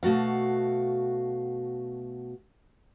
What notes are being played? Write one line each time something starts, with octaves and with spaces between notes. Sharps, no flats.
B2 A3 F#4 F5